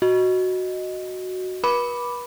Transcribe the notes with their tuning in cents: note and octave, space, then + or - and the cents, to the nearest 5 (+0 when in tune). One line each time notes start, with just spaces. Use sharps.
F#4 +0 D#5 +0
B4 -40 B5 +0 D6 +0